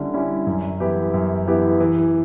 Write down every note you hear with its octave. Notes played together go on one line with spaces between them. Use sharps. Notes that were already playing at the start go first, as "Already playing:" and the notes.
Already playing: D3 G3 C#4 E4
G3 C#4 E4
F#2
E3 B3 E4 G4
F#2
E3 B3 E4 G4
E3